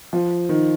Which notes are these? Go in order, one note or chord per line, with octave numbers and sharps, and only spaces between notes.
F3
D#3